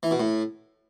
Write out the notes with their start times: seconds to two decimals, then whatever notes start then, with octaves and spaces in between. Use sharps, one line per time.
0.03 E3
0.11 B2
0.20 A2